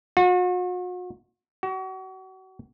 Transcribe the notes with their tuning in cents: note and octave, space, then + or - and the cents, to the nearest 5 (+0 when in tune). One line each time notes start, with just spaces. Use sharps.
F#4 -40
F#4 +35